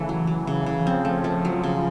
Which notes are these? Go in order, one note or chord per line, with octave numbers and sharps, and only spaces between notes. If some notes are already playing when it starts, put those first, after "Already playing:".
Already playing: C#3 E3 A3
F#3
F#3
C#3
C#3
E3
F3 C4
A3
A3
F#3
C#3